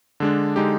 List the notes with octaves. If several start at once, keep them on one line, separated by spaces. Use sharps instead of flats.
D3 G#3 D4
D3 G#3 D#4 G4